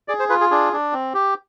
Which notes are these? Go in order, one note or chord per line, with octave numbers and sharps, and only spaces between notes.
G#4 D5
C5
F4 B4
G#4
D4 G#4
D4
C4
G4